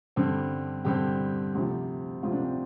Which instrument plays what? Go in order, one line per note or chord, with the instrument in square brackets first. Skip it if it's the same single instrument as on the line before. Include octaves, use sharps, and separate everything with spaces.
[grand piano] G2 D3 G3 C4
G2 D3 G3 C4 G4
D2 C3 F3
D2 C3 F3 F4
D4
C4
D4